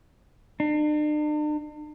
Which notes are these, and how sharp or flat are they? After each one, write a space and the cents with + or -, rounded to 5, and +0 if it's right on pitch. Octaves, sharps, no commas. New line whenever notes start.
D4 +45